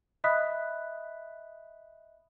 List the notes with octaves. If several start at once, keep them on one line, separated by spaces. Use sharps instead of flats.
D#5 E5 B5 D#6 F#6 B6